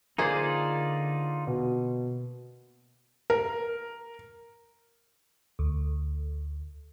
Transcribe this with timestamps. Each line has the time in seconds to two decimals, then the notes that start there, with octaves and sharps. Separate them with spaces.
0.18 D3 A#3 D#4 F4 G#4 C5 D5
1.47 B2
3.30 A#4
5.59 D2